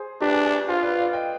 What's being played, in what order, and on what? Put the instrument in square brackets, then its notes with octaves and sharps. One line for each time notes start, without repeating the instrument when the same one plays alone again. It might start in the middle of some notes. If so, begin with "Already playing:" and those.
Already playing: [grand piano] G#4 C5
[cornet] D4 [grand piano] G4 B4
[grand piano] G#4
G#4
[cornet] F4 [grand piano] G#4 C5
[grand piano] B4 D5
D5 F5
D#5 G5